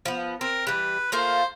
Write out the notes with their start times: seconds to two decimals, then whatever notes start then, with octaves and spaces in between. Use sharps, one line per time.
0.05 F3 B3
0.41 C4 A#4
0.67 E3 G3 B4
1.12 A3 A#3 F4 C5